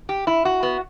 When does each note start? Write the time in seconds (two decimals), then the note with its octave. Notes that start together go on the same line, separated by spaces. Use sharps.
0.09 G4
0.27 E4
0.45 F#4
0.63 B3